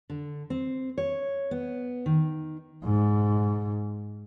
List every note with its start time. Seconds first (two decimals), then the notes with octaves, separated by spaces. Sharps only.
0.10 D3
0.50 C4
0.98 C#5
1.51 B3
2.06 D#3
2.84 G#2